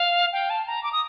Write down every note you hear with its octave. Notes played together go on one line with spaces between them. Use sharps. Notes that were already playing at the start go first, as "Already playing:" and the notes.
Already playing: F5
G5
A5
A#5
D6
D#6